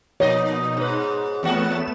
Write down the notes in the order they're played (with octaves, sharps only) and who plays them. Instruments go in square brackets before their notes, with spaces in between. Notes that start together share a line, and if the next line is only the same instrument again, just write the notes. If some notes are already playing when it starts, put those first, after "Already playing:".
[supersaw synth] B2 D#4 [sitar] F3 A#3 D#5 [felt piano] C#5
[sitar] G#2 B4
[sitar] E2 F#4 [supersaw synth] A3 B3 E7